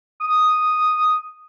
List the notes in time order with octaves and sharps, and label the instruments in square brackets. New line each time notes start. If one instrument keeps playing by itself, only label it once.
[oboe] D#6